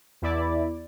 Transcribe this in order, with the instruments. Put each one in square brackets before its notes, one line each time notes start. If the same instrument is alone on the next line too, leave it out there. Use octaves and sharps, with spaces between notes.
[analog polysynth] E2 E4 D5